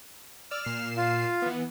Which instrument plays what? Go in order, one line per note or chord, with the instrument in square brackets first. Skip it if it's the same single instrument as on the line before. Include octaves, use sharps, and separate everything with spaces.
[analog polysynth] D5 E6 [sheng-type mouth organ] F6
[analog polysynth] A#2 C7 E7
[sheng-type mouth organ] F4 F5
[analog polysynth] E3 B3